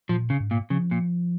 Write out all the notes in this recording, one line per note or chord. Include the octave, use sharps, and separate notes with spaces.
A#2 F3
C#3
G#2
A#2
C#3 F3
A#2